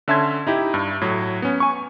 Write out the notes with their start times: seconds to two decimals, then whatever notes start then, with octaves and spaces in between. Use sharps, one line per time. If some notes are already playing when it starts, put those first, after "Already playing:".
0.08 D3 C#4 E5 A5 C6 G#6
0.47 D#4 E4 G4
0.74 G2
1.01 A2 F#3
1.42 B3 C#4
1.60 G#5 C#6